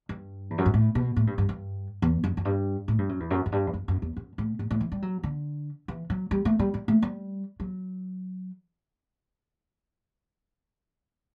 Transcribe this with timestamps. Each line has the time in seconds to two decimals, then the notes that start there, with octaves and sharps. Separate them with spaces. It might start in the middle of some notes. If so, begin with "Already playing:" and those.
0.09 G2
0.50 E2
0.58 F#2
0.66 G2
0.74 A2
0.95 B2
1.16 A2
1.27 G2
1.38 G2
1.49 G2
2.02 E2
2.24 F#2
2.37 F#2
2.45 G2
2.88 A2
2.99 G2
3.09 F#2
3.20 E2
3.31 F#2
3.46 F#2
3.52 G2
3.67 E2
3.74 F#2
3.88 F#2
4.02 E2
4.17 F#2
4.38 A2
4.59 A2
4.71 A2
4.81 E3
4.92 G3
5.02 F#3
5.23 D3
5.88 E3
6.10 F#3
6.31 G3
6.45 A3
6.59 G3
6.74 G3
6.88 A3
7.02 G3
7.60 F#3